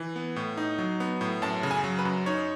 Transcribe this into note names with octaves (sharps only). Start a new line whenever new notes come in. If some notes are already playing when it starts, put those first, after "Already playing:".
Already playing: E3
B3
A2
D#4
F#3
B3
A2
F#2 A5
C#3
G#5
F#3
B4
F#2
D#4 C#5